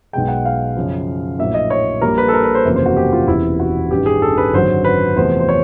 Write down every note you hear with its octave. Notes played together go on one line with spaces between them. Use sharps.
B1 B2 G#3 G5
F#5
F5
F#2 C#3 F3
A#1 A2 F#3 A#3 E5
D#5
C#5
A#1 A#2 G3 A#3 A#4
B4
A4
A#4
B4
C5
F#1 E2 C3 F3 A#3
C5
F#4
G4
F4
E1 E2 C3 E4
F#4
A1 G2 D#3 G4
G#4
A4
B4
G#1 F#2 D3 F#3 C5
B4
E2 C3 F3 A3 C5
C5
C#5